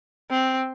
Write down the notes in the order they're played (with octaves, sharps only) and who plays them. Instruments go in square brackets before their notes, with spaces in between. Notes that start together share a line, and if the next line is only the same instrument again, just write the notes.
[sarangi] C4